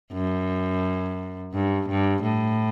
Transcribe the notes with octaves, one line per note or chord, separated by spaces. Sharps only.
F#2
G2
G2
A2